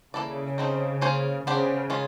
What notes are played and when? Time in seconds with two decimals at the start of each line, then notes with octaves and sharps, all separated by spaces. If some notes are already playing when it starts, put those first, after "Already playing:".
0.14 C#3 A#3 C#4 E4 A4 D5
0.58 F3 A3 C4 D#4
1.01 A#3 C#4 F4 G#4 C5
1.46 C#3 B3 D4 G4 C5
1.90 D#3 G#3 C#4 F4